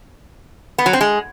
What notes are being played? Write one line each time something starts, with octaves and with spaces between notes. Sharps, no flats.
B3
F#3
C4
G#3